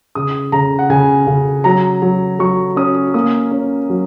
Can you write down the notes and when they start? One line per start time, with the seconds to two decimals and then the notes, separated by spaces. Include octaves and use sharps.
0.15 C#3 D#6
0.52 C#3 A#5
0.79 F#5
0.90 C#3 G#5
1.27 C#3
1.64 F#3 A#5
2.02 F#3
2.39 F#3 C#6
2.76 C#4 D#6
3.14 A#3 D#6
3.51 C#4
3.90 F#3